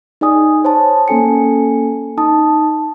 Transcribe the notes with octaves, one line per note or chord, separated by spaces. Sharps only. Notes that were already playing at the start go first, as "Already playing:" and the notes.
D#4 G#4 D5 G#5 D#6
C5 C#5 A5
A#3 C#4 A4 G#5 C#7
D#4 A5 D#6